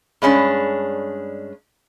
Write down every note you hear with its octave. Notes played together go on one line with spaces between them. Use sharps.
G2 G#3 C#4 D4